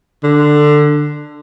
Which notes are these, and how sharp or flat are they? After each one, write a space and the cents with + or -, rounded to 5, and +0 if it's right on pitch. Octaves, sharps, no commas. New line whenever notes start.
D3 +15